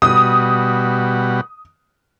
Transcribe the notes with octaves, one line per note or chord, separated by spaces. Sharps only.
B2 G3 F#4 D#6